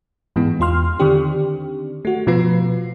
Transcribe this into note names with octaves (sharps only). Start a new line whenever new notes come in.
G#2 E3 G#3 B3
E2 F4 C6 F6
D3 D#3 C4 D4 G4
A3 F#4
B2 F3 B3 F4 B4 C7